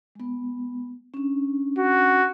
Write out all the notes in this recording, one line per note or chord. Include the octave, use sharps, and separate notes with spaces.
G#3 B3
C#4 D4
F#4